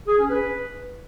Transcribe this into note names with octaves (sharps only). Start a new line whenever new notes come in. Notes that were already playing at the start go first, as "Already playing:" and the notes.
G#4
C#4
B4